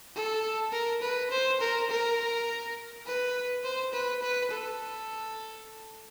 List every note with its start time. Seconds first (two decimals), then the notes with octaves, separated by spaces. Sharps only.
0.15 A4
0.73 A#4
1.02 B4
1.31 C5
1.61 A#4
1.90 A#4
3.06 B4
3.64 C5
3.94 B4
4.23 B4
4.51 A4